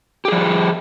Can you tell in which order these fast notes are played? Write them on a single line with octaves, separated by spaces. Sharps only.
G4 G#4 F3